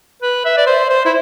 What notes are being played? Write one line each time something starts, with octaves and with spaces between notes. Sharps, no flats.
B4
E5
D5
C5
C5
E4